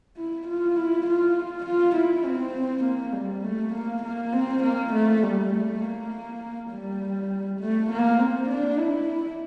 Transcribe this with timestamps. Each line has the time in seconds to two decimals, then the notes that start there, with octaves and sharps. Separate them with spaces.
0.17 E4
0.47 F4
0.76 E4
1.07 F4
1.65 F4
1.96 E4
2.25 C4
2.84 A#3
3.14 G3
3.44 A3
3.73 A#3
4.03 A#3
4.33 C4
4.63 A#3
4.93 A3
5.23 G3
5.52 A3
5.82 A#3
6.71 G3
7.59 A3
7.90 A#3
8.19 C4
8.49 D4
8.79 E4